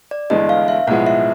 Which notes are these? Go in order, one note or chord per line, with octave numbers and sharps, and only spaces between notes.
D5
G1 G2 E3 G#3 D#5
F5
E5
B1 A2 F3 G#3 B3 F#5
E5